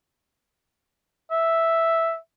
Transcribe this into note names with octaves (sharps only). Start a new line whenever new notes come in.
E5